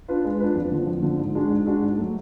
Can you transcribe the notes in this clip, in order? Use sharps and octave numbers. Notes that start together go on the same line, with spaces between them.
D4 F4 B4
G#3
D4 F4 B4
F2
D3 F3
F2
D3 F3
G#2
G#3 D4 F#4
G#2
G#3 D4 F#4
G#2
F#3 A3